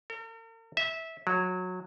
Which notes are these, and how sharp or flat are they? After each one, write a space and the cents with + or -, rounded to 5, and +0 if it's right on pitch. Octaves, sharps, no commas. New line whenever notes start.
A#4 -45
E5 -15
F#3 -15